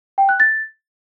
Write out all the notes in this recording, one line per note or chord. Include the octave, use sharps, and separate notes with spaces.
G5
F#6
A6